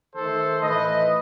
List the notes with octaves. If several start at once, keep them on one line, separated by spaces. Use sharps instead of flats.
D#3 A3 A4 C5
A2 E3 A3 B4 D#5